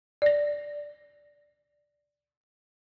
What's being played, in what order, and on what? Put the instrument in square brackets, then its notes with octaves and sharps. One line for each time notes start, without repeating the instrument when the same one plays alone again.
[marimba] D5 A#6